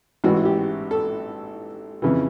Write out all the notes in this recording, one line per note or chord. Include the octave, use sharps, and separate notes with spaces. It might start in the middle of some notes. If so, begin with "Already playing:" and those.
A1 G#2 E3 F#4
G4
A4
F2 C#3 E3